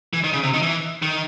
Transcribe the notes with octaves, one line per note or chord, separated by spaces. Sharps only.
E3
D#3
C#3
C3
D#3
E3
D#3